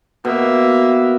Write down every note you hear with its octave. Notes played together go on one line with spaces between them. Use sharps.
B2 A#3 E5